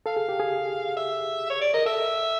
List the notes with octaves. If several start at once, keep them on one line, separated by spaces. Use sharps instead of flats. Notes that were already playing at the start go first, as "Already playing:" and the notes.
A4 F5
G#4
G4
G#4
E5
C#5
D5
A#4 D#5
A4 E5